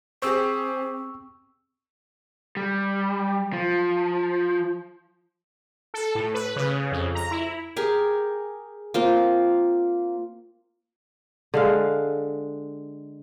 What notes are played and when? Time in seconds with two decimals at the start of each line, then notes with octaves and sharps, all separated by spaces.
0.22 C4 G4 G#4 C5 C#6 E6
2.57 G3
3.53 F3
5.94 A4
6.15 A2
6.34 B4
6.56 C#3
6.91 F2
7.15 A#5
7.31 E4
7.76 G4 G#4 A#4
8.94 A#3 C4 F4
11.54 D3 G#3 F5